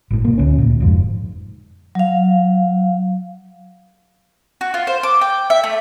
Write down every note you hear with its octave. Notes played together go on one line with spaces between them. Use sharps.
G#1 A2
B2 A#3
D2 C#4
D2 A#2
F1 F2 G#2
F#3 F5
F#4
F4
C5
D6
G5
E5
A3